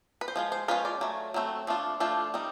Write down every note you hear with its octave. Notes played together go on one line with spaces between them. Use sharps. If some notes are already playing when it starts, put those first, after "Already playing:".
B4
C5
F3 G#3 F4
C5
F3 G#3 C#4 F4 B4
D5
F#3 A3
F#3 A3 C4
F3 A3 D4 F4
F3 A3 D4 F4
G3 C4 D#4